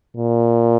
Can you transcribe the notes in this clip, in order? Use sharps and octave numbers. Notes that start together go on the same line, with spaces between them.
A#2